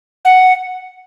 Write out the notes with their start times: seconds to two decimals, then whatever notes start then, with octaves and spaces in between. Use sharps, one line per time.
0.25 F#5